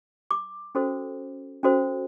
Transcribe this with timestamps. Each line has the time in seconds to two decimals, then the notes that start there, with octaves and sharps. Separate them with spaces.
0.31 D6
0.75 C#4 F#4 A4 C5
1.63 C#4 F#4 A4 C5